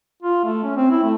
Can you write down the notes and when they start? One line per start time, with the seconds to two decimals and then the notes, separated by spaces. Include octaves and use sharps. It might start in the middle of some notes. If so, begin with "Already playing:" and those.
0.22 F4
0.44 A3
0.63 C#4
0.77 C4
0.90 E4
1.03 A3